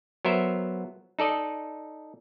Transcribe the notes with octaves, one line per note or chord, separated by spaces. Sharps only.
F#3 B3 A#4 C5 E5
D#4 A4 D5 D#5